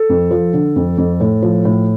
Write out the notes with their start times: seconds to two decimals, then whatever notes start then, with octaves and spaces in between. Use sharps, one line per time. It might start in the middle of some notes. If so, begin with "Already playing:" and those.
Already playing: A4
0.09 F2
0.31 F3
0.53 D3
0.76 F2
0.98 F2
1.20 A2
1.42 F3
1.65 A2